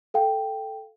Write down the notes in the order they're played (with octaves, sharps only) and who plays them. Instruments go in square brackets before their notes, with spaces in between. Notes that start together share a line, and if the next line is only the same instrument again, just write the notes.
[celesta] A4 F5 G5